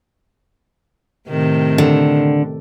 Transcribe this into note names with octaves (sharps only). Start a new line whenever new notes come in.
A2 C3 D#3
D3